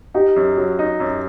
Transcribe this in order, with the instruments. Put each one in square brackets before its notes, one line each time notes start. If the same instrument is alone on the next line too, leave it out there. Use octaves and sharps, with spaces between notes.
[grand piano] D#4 [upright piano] G4
[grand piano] F#2
F#3
D#4
F#2